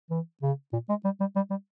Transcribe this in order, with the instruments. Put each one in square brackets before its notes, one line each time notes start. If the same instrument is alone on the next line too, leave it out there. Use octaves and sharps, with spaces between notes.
[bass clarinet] E3
C#3
A#2
G#3
G3
G3
G3
G3